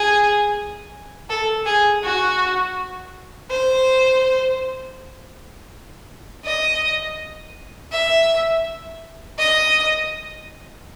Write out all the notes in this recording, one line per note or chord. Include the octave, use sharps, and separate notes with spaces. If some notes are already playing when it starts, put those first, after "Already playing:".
Already playing: G#4
A4
G#4
F#4
C5
D#5
E5
D#5